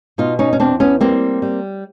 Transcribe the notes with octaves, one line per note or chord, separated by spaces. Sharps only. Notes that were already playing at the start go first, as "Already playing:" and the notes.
B2 D#4 F4
C#4 D#4
C#4
E2 C4 D4
B3 C#4
G3 A#3 C4
G3